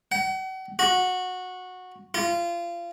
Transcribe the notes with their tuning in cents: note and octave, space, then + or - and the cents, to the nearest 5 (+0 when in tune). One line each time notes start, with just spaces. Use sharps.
F#5 +40
F#4 -15
F4 -25